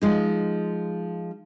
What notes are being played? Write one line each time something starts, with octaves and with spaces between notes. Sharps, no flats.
F3 G#3 D#4